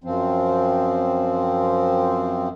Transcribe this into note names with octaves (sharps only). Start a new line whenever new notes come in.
F#2 F3 C4